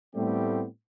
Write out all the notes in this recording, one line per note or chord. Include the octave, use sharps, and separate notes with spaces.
A2 G3 A3 B3 C4 G4